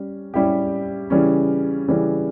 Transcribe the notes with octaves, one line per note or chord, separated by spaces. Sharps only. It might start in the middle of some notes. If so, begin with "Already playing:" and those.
Already playing: G3 C#4
G3 C#4 E4 G4
C#3 E3 G3 C#4
C#3 E3 G3 C#4